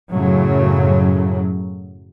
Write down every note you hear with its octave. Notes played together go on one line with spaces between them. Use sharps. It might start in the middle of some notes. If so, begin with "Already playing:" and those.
F#2 A2 C#3 F#3